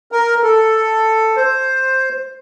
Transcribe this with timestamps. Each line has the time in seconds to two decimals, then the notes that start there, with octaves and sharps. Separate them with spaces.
0.12 A#4
0.43 A4
1.37 C5